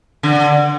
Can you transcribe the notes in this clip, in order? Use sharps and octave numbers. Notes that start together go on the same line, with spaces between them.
D3